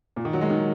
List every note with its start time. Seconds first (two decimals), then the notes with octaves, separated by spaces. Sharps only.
0.16 A#2
0.25 D#3
0.33 F#3
0.41 G#3
0.50 D#3